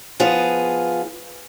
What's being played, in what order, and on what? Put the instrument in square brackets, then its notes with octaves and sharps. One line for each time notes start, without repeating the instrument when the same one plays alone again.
[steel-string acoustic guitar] F3 B3 F4 G#4